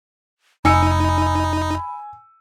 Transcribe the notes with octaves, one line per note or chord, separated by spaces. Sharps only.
F1 D#4 G#5 B5 E6 C#7